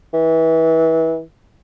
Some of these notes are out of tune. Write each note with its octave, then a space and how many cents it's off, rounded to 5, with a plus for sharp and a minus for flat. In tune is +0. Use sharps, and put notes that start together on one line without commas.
E3 -25